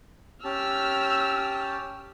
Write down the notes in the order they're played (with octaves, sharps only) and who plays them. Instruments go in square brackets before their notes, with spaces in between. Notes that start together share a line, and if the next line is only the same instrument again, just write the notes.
[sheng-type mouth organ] C#4 G4 A5 [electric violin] E6 F6